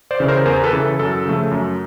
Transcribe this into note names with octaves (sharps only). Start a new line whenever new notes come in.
C5 D5
C#3 E3
A#4 C5
E2 A#4 C5
A4 B4
C#3 E3
A4
F#2 A4
C#3 F3 A3
F#2